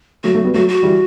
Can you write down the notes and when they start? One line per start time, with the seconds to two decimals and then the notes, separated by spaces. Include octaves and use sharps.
0.24 F#3 A3 F#4
0.34 F#3 A3
0.44 G3 B3
0.54 F#3 A3 F#4
0.68 F#4
0.83 E3 G3